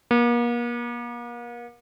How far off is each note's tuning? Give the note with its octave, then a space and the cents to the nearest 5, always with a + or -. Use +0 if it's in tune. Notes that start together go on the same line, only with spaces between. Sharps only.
A#3 +40